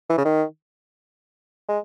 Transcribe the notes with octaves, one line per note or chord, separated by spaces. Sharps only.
E3
C#3
D#3
G#3